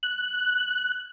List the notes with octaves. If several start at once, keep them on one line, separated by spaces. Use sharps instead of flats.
F#6